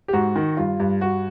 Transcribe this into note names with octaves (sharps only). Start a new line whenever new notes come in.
G4
G#2 F#4
D#3
G2 F4
G2
G2 F#4